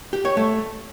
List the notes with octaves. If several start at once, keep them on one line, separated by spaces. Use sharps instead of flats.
G4
C#5
A3